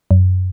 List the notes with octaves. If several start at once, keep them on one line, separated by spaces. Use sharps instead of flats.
F#2